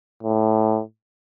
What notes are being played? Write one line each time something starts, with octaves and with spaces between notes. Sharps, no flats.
A2